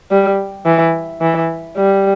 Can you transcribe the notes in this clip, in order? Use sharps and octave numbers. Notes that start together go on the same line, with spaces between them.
G3
E3
E3
G3